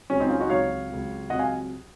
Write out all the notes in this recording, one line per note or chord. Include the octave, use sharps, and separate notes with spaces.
C#2 C3 F#3 C#4
C4 D#4
C#4 F4
D#4 F#4
C#2 C3 F#3 C#5 F5
C#2 C3 F#3
C#2 C3 F#3 D#5 F#5
F5 G#5